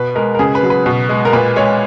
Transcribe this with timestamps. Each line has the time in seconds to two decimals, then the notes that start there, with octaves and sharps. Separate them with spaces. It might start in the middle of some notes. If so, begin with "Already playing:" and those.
Already playing: B2 B4
0.15 G#3 A#4
0.35 A#4
0.39 C#3 G#4
0.55 B4
0.63 F#3
0.70 B4
0.86 B2
1.09 G#3
1.25 A#4
1.33 A#2 B4
1.56 G#3 C#5